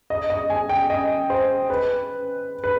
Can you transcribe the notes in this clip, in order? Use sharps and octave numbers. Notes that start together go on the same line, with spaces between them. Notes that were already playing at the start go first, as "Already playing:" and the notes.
D#5
D#5
G#5
G5
D#5
C5
B4
B4